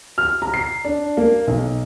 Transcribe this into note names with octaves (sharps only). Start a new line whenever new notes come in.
F6
A#5
C7
D4
A#3
B1